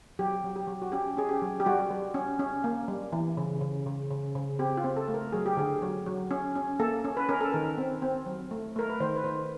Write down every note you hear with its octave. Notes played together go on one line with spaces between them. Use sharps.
F#3 G4
F#3
G4
F#3
F#4
C#4 G4
C#4 G#4
G4
F#3
G4
G3 F#4
G3
C#4
C#4
A#3
G3
E3
C#3
C#3
C#3
C#3
C#3
C4 G4
F4
C4
A4
A3
A#4
F#3 G#4
G4
D3 G#4
F#3
F#3
C#4
C#4
A#3 A4
C#4
B4
C#4 A#4
A4
D#3 A#4
C4
C4
F#3
A3
A3 A#4
B4
D#3 C5
B4
D#3 C5